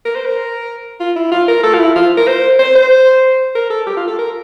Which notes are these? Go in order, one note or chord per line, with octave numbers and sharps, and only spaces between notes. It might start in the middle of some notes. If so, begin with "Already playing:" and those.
A#4
C5
A#4
F4
E4
F4
A#4
A4
F4
E4
F4
A#4
C5
C5
C5
A#4
A4
G4
F4
A4
A#4